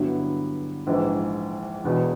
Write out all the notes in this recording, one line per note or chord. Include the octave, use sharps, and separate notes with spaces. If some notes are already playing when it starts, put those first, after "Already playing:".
Already playing: G2 D3 F#3 B3 E4
A#1 G#2 E3
E1 E2 B2